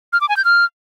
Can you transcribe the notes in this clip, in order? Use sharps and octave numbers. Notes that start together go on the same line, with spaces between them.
F6
D6
G#5
G6
F6